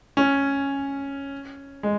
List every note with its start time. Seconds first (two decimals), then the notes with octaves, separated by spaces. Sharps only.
0.17 C#4
1.83 G#3